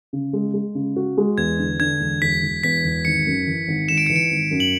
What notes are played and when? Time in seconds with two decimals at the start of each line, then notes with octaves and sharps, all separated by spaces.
0.13 C#3
0.33 G#3
0.54 G#3
0.75 C#3
0.96 F#4
1.17 G#3
1.38 E2 G#6
1.59 D3
1.80 D3 G#6
2.01 E1
2.22 E1 B6
2.43 E1
2.63 E2 B6
2.84 E1
3.05 G#1 C#7
3.27 F#2
3.47 E3
3.68 G#1
3.89 G#1 E7
3.98 D7
4.06 E3 C#7
4.16 D7
4.31 G#1
4.51 F#2
4.60 F#7